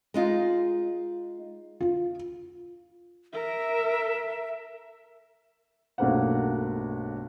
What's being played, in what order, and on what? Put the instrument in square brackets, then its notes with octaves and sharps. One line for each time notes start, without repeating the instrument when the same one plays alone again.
[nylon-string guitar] G#3 D#4 F4
[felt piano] F4
[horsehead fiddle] A#4 [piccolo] E5
[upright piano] B1 G2 A3 A#3 C5 F#5